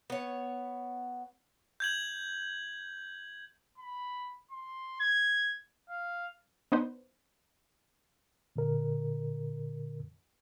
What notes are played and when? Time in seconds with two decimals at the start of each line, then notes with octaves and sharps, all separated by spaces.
0.10 B3 C#5
1.80 G6 G#6 F#7
3.78 B5
4.51 C6
5.00 G#6
5.89 F5
6.72 B3 D4 D#4 B4 C5
8.56 A#2 D3 A#4